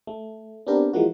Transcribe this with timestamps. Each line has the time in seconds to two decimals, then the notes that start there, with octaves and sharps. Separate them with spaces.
0.07 A3
0.67 B3 C4 D4 G4 A#4
0.93 E3 F3 G#3 A#3 F#4